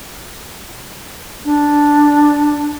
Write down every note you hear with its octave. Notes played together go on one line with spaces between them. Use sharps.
D4